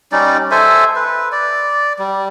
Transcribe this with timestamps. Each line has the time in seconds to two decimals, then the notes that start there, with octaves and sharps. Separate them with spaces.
0.12 G3 C#4 D#4 D5
0.51 A4 C5 E5 G#5
0.96 B4
1.32 D5
1.99 G3